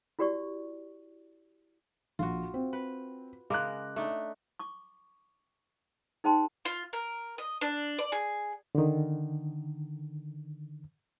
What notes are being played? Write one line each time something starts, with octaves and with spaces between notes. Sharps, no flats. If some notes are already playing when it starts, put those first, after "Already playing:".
E4 F#4 G4 D5 C#6
A#1 F4 F#4
C4
B4
C#3 G#3 A#4 D6 F#6
A3 D4 D#4
C#6 D6
D#4 G#4 C5 G5 A5 C6
F4
A#4
D#5
D4
D5
G#4
D3 D#3